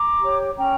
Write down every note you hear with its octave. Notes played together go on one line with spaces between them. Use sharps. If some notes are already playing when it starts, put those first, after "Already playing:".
Already playing: A#5 D6
G4 C#5
C#4 G5 A#5